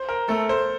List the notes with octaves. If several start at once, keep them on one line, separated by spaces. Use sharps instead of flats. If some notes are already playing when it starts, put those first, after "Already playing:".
Already playing: C5
A#4
A3 A4
C5